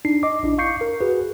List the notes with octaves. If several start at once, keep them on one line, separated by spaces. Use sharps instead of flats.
D4 D#4 C7
D#5 D6
A#1 D4 E4
F5 C#6 G6 C7 C#7
A#4
F#4 G#4 B4